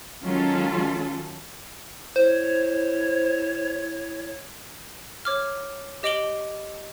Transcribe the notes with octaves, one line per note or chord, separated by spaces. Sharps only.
D#3 F#3 G#3 C#4 F4 A4
E4 C5 C#5
C#5 D6 F6
G4 D#5 D6 D7 F#7 G7